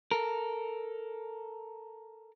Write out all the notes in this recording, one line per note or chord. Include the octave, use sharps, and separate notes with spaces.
A4 A#4